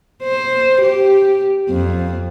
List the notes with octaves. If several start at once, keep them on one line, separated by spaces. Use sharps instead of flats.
C5
G4
F2